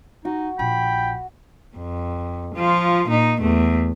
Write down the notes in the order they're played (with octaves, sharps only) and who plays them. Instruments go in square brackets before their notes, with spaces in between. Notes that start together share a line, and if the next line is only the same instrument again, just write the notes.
[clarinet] D#4 [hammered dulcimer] F#4
[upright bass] A#1 [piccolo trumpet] G5 [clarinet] B5
[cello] F2
F3 F4
A#2 D#4
E2 A3